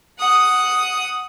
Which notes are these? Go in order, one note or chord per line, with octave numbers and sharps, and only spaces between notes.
F#5 D#6